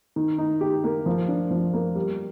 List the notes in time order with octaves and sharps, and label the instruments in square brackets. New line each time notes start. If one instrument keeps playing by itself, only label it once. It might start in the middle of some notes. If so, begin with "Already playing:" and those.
[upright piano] D#3
D#4
G4
A#3
F3
D4
F3
A#3
G3